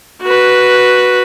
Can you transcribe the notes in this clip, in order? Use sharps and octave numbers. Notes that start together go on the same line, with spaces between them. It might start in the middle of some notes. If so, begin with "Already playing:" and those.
F#4 B4